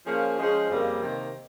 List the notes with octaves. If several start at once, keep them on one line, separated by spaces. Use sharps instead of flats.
F3 A#3 C#4 F4 G#4
F3 G#3 C#4 G#4 C5
F2 C#3 G3 A#3
C3 D#3 A#3